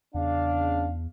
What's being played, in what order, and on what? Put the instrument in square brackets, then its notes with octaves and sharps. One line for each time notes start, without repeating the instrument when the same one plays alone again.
[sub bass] E2 [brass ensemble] C#3 D4 F5